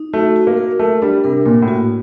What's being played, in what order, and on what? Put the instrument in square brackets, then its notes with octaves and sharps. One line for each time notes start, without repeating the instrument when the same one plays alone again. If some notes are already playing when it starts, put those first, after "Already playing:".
Already playing: [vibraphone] D#4
[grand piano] A3 [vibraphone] F#4
[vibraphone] F#4
[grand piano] A#3
[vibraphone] A#4
[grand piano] A3 [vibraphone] A#4
[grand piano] G3 [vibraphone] D4
[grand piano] C3 [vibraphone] A#4
[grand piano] A#2 [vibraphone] A#3
[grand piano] A2
[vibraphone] F#4